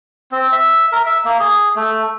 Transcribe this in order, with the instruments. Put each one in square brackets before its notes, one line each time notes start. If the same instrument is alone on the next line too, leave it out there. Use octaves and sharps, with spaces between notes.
[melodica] C4
E5
A#4
E5
A#3
G#4
A3